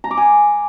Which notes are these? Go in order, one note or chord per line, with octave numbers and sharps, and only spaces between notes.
A#5
D6
G#5